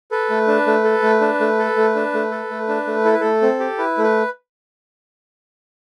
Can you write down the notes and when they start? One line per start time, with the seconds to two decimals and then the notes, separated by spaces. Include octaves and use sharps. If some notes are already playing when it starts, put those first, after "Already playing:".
0.11 A4 B4
0.30 A3
0.47 D4
0.67 A3
0.84 A4
1.03 A3
1.21 D4
1.40 A3
1.59 A4
1.76 A3
1.95 D4
2.14 A3
2.31 A4
2.51 A3
2.68 D4
2.87 A3
3.05 E4 A4
3.13 B4
3.21 A3 A4
3.42 C4
3.60 G4
3.78 E4 B4
3.98 A3
4.04 B4